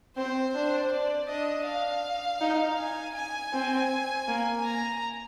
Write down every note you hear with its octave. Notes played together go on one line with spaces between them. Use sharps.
C4 C5
D4
D5
D4 D#5
F5
D#4
G#5
G#5
C4
A#3
A#5